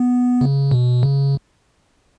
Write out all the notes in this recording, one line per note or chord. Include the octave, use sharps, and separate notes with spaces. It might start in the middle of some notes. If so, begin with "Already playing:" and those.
Already playing: B3
C#3
B2
C#3